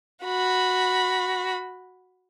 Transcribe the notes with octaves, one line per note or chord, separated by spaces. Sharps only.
F#4 B5